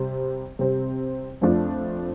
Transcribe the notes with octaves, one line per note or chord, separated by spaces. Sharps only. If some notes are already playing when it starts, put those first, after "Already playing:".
Already playing: C3 G3 C4
C3 G3 C4
F2 F3 A3 D4 F4